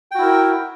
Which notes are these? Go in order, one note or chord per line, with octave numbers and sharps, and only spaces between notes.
E4 F#4 A#4 G5